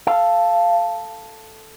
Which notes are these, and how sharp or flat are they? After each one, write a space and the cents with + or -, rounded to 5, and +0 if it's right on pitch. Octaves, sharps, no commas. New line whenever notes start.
A4 +0 F5 -10